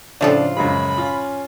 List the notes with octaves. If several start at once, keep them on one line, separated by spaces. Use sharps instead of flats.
A2 C#3 F3 D4 F4 A4
F#2 C#3 G#3 B5
C#4 F4